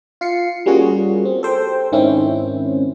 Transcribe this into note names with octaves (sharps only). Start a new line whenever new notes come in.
F4 C7 C#7
G3 A#3 C#4 F4 F#4 G#4
C4
A4 C5 G5
G#2 D#3 C4 C#4 E4